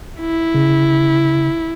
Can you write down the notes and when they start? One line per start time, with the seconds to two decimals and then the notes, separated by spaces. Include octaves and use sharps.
0.21 E4
0.54 C#3